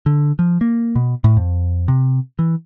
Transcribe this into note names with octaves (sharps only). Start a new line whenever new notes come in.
D3
F3
A#3
B2
A2
F2
C3
E3